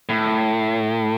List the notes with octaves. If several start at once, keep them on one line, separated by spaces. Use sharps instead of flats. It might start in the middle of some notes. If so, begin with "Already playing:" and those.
A2